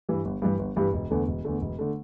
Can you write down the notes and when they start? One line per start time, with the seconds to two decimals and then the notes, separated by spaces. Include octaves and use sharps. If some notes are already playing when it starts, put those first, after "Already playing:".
0.09 G2 E3 G3
0.25 G1
0.42 G2 E3 G3
0.59 G1
0.76 G2 E3 G3
0.94 E1
1.11 E2 D3 A3
1.28 E1
1.45 E2 D3 A3
1.61 E1
1.79 D3 A3